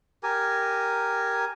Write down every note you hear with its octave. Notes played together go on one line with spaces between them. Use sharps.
G4 A#4 G#5